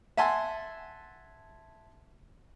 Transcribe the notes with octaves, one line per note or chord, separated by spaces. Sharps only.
E5 F#5 G#5 A5 C6